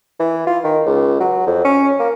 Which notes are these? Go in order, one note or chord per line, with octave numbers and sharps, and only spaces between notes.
E3
F4
D#3
C#2
F#3
F2
C#4
A#3